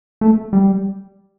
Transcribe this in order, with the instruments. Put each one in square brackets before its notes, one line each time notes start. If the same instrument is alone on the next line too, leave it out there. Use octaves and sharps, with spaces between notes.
[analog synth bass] A3
G3